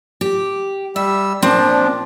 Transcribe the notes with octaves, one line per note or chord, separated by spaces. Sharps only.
G4
G3 E5 E6
A#2 F3 C4 D4 A5